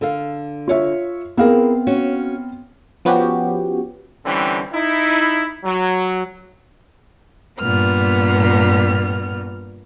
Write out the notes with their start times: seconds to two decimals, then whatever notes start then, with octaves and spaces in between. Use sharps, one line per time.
0.01 D3 A4 F5
0.68 F4 C#5 E5
1.37 B3 C4 E4 G#4 A#4 F5
1.87 C#4 F#4
3.05 F3 B3 C#4 F#4 G4
4.25 D3 E3 G3 C4 C#4
4.73 D#4 E4
5.64 F#3
7.60 G2 A#2 B3 F6